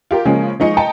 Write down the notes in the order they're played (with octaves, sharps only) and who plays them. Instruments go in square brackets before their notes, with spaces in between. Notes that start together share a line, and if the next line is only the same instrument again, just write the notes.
[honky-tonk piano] F4 G4 A#4
C#3 F3 G#3 A#3 C#4
F3 G#3 D#4 D#5 C#6 C#7
D#5 G5 A5 A#5 C#7